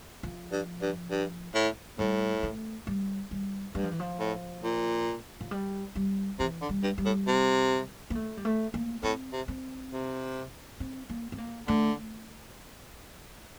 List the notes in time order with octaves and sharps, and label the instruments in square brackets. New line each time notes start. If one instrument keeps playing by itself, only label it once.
[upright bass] F3
[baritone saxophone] G2
G2
G2
A2
[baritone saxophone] A2 [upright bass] G3
[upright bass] A3
G3
G3
[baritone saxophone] G2 [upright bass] G3
[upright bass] F3
E3
F3
[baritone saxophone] A2
A#2
[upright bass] F3
G3
G3
[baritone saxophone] C3 [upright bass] E3
[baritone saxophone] D3
[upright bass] G3
[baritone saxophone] G2
[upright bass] G3
[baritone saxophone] A2
C3
[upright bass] A#3
A3
G3
A3
A#3
[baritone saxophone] A2 [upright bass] C4
[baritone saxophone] C3
[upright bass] C4
[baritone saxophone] C3
[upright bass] C4
A#3
C4
A#3
[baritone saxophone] D3 [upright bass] A3